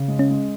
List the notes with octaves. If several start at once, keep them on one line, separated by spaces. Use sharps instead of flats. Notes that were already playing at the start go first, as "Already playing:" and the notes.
Already playing: C#3
G#3
C#4
G#3